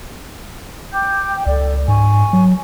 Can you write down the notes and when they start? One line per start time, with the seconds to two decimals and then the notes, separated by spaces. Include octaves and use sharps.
0.92 G5 D6 G6
1.34 G5
1.46 C#2 A4 D5
1.88 G#2 G#5 C#6
2.33 F#3